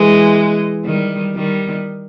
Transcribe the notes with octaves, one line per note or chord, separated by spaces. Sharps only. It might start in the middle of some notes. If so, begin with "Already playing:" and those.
Already playing: E3 G#3
D#3 G3
D#3 G3